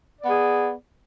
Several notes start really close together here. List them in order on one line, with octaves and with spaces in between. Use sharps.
D5 B3 G#4